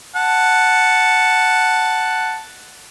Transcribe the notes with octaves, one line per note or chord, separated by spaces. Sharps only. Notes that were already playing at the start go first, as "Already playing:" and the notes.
F#5 A5